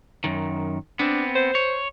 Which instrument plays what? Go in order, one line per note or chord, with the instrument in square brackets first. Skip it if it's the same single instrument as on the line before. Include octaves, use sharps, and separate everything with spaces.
[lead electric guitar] F#2 D#3
[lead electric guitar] B3 C4 [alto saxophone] D4
[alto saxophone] C5
[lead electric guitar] C#5